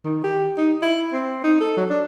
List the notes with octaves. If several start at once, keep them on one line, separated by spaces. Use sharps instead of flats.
D#3
G4
D#4
E4
C4
D#4
A4
F#3
D4